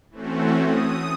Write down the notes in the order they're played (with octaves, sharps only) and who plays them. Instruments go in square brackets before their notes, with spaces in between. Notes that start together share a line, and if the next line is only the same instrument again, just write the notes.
[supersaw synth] E3 A3 C4 C#4 F#4
D#6